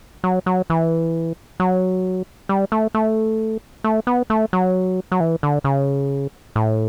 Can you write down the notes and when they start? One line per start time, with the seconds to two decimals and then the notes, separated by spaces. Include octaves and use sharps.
0.24 F#3
0.46 F#3
0.70 E3
1.60 F#3
2.49 G3
2.72 A3
2.94 A3
3.84 A3
4.07 B3
4.30 A3
4.53 F#3
5.12 F#3
5.20 E3
5.43 D3
5.64 C#3
6.56 A2